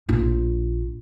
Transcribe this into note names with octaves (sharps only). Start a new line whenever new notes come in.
A#1 F4